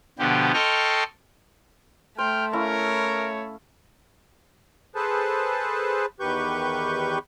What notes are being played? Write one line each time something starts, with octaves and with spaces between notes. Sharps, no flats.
B2 D3 F3 B3 G4
A4 D#5 G5 C6 C#6 F6
A3 C5 G5 F6
C#4 E4 A#4 C#5 F5
G#4 A4 B4 C5 A5
E2 D#3 G4 B4 C#6 G6